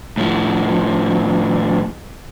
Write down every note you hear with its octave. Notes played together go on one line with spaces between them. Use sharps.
A2 F3